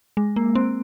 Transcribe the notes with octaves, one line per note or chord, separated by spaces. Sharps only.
G#3
A#3
C4